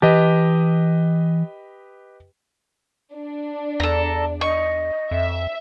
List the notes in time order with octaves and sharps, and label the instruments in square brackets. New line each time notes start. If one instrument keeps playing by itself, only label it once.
[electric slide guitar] E3 A5 [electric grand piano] G4 B4 D#5
[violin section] D4
[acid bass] E2 [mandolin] A4 A#5
[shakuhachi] D#5 [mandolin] C#6
[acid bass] F2 [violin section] E5